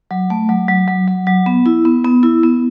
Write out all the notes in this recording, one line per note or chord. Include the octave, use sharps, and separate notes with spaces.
F#3
A3
F#3
F#3
F#3
F#3
F#3
B3
E4
B3
B3
E4
B3